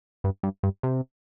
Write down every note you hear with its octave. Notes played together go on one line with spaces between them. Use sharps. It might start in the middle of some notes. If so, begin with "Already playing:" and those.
G2
G2
G2
C3